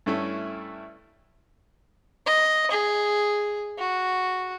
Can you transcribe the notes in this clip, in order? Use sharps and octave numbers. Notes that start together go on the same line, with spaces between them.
G2 A3 C#4 E4
D#5
G#4
F#4